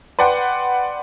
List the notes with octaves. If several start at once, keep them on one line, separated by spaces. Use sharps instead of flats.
B4 D5 F#5 G5 C6